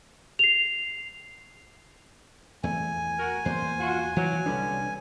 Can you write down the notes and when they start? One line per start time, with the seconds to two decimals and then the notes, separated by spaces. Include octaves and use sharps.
0.39 C7 F7
2.63 E2 A3 G#5
3.19 F#4 A#4
3.45 E2 A#3 C5
3.80 F4 F#4
4.16 E3 F#3
4.46 C2 D3 G3 B3 C#4 D4